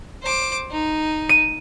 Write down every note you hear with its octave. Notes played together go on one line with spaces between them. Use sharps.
C5 D6
D#4
D#7